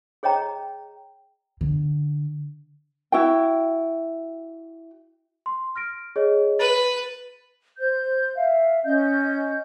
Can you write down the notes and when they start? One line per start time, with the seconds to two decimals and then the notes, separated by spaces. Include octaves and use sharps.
0.23 G#4 C#5 D#5 G5 A#5
1.61 D3
3.12 E4 F#4 G5
5.46 C6
5.76 F6 A#6 D7
6.16 G#4 C#5 D#5
6.59 B4 A6
7.78 C5 G6
8.35 E5 F5
8.84 C#4 D#5 G6